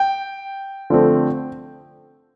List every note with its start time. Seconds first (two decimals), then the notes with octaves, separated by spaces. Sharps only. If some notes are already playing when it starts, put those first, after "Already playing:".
Already playing: G5
0.90 D3 F3 A3 C4